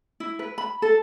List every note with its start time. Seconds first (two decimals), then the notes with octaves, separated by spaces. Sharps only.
0.20 E4
0.39 B4
0.58 B5
0.82 A4